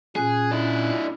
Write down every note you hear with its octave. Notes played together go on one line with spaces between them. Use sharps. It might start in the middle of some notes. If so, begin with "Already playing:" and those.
A#2 C#4 G#4 F#6
D4 E4